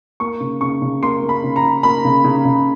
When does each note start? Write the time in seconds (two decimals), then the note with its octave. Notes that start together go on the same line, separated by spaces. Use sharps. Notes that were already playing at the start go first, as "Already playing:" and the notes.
0.20 A#3 C#6
0.40 C#3
0.61 C#3 C#6
0.82 C#3
1.03 A#3 C6
1.23 A#3
1.29 B5
1.44 C#3
1.56 A#5
1.63 C#3
1.83 A#3 B5
2.05 C#3
2.24 C#3
2.45 C#3